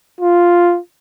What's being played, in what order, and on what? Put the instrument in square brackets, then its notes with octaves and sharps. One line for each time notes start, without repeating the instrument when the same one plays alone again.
[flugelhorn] F4